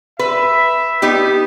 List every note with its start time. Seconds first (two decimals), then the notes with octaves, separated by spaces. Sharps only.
0.19 B4 E5
1.02 B3 D#4 G4